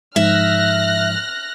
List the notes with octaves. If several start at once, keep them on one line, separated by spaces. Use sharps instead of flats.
G#2 F3 E5 F6 F#6 A#6